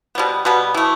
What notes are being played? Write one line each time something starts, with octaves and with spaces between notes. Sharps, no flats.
B2 G3 B3
B2 G3 B3
E3 A3